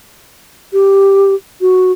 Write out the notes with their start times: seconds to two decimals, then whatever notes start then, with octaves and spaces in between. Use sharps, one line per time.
0.73 G4
1.61 F#4